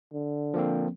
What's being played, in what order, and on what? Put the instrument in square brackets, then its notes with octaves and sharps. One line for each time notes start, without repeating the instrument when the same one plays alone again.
[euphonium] D3
[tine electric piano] F3 A#3 C4